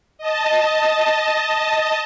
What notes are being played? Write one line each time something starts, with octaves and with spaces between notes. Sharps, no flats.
D#5 A5